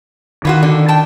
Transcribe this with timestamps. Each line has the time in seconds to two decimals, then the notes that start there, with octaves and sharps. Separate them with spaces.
0.45 D#3 E3 F4 F#4
0.63 D3
0.88 G5 A5